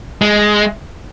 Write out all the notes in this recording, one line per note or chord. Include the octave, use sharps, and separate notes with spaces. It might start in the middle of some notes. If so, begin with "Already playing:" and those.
G#3